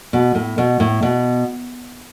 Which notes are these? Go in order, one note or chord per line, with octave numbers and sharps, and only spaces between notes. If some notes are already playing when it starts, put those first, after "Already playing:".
B2
A2
B2
A2
B2